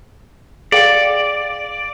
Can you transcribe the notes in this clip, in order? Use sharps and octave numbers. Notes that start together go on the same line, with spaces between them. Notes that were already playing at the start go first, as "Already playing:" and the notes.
G#4 D5 F5 G5